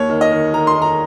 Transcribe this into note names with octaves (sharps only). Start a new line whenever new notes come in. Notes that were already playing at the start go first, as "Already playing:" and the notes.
Already playing: D#2 C#5
D#3
D#5
D#3
D#3 A#5
C6
D#3
A#5